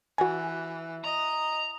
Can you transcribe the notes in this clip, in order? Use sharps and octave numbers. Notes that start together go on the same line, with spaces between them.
E3 F#4 G#5
D#5 A#5